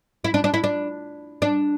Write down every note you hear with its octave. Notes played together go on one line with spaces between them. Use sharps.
E4
D4
D4
E4
D4
D4